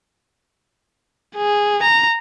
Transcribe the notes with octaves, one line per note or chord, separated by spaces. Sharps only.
G#4
A#5